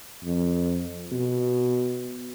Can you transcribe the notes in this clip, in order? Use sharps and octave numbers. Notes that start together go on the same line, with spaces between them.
F2
B2